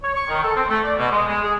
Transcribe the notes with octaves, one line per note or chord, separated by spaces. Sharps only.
C#5
C#6
D#3
A4
C4
A3
D5
B2
G#3
G#3
G#4